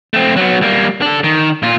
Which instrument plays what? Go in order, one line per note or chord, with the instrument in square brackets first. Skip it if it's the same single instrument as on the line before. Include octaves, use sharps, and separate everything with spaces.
[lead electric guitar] A3 C4
F#3 B3
G3 A#3
D4 A4
D#3
A#2 F4